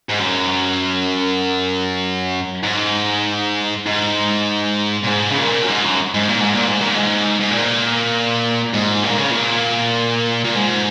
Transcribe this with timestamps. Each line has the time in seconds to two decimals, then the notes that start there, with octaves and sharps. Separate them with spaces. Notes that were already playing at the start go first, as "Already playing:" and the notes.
0.10 G#2
0.21 F#2
2.64 G#2
3.87 G#2
5.04 A#2
5.08 G#2
5.31 C#3
5.39 A#2
5.62 F#2
5.68 G#2
5.84 F#2
6.14 G#2
6.28 A#2
6.41 G#2
6.55 A#2
6.67 G#2
6.81 A#2
6.95 G#2
7.41 G#2
7.51 A#2
8.74 G#2
9.04 A#2
9.18 C#3
9.30 A#2
10.44 A#2
10.55 G#2